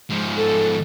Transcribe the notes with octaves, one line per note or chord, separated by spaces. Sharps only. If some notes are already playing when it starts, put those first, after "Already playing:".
G#2 F3
A4